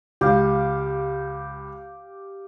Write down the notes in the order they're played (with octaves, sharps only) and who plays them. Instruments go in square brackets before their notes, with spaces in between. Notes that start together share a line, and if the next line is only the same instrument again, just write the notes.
[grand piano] C#2 [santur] G4 F5